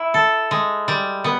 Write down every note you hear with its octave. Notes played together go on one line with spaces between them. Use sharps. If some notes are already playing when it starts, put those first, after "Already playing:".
Already playing: E4
A4
G#3
G3
B3